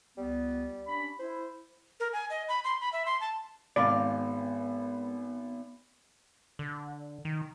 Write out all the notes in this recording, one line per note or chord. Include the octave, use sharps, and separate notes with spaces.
C#2 G3 B3
C#4 D4 B5
E4 C5
A#4
G#5
D#5
B5
C6
B5
E5
C6
A5
G#1 G#3 B3 C4 D5 F5
D3
D#3